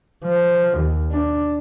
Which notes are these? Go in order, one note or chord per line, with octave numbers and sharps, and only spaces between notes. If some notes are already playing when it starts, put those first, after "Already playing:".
F3
D#2
D4